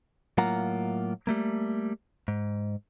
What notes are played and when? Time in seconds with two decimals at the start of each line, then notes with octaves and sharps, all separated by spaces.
0.38 A2 F#3 A#3 F4 F#5 A#5
1.27 G3 A3 A#3
2.28 G#2